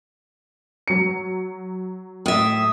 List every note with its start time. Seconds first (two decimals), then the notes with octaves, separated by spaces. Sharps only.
0.88 F#3 C#7
2.26 A2 E5 D#6